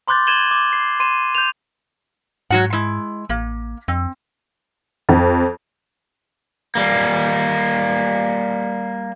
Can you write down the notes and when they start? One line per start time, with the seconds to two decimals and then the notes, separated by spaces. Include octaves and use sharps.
0.08 B5 C6 D6 F#6 G6 A6
0.27 G#6 D#7 E7 F#7 G7
0.51 D6
0.73 C7
1.00 C6 D#7 E7
1.35 G6 F7
2.50 G#2 F#3 F#4 F#5
2.73 G#3 E4
3.29 A1 A#3
3.88 F2 C4
5.09 F2
6.75 G3 A#3